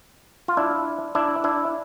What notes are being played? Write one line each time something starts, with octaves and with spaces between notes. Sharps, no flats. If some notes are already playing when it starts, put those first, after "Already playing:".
F4
D4 E4
D4 E4
D4 E4